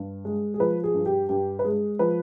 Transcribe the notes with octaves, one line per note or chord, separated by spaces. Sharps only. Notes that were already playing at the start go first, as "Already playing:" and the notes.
Already playing: G2
G#3
G#4
F3 B4
G#4
G2
G4
G2 G4
B4
G#3 G#4
F3 B4